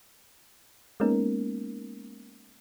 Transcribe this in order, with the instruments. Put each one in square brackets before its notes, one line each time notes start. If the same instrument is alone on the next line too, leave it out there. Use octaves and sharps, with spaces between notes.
[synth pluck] G#3 A#3 B3 C#4 D#4 A#4